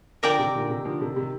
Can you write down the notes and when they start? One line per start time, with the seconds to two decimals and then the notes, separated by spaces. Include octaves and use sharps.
0.23 D3 F3 A#4 D5 G5 A#5
0.39 C3 D#3
0.55 A#2 D3
0.69 C3 D#3
0.85 D3 F3
1.01 C3 D#3
1.16 C3 D#3